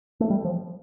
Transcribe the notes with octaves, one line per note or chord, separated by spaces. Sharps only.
A3
G3
F3